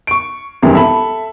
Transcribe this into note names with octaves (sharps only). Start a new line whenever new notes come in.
C#6 D7
E1 C2 F#2 C3 D#3 E3
A4 E5 A5 B5